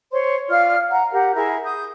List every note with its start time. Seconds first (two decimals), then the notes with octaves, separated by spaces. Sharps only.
0.12 C5 C#5 C6
0.49 F4 D5 F5 F6
0.91 F#5 A#5
1.12 G4 A#4 F#5
1.34 E4 G#4 A#4 E5
1.64 D#6 G6